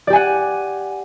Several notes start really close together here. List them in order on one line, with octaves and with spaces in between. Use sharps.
D5 G4 G#5 F#5